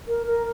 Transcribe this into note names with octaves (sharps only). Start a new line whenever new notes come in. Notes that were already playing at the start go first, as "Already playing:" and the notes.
A#4
A#4